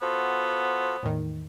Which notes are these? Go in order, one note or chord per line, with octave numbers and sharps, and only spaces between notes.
B3 F4 F#4 A4 C5
E2 A2 D#3